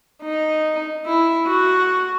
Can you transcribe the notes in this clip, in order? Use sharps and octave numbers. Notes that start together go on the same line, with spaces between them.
D#4
E4
F#4